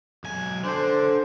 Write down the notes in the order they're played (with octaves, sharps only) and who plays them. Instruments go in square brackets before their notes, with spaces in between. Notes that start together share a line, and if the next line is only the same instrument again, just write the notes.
[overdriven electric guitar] B1 G#5
[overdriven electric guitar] D4 A4 [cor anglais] C5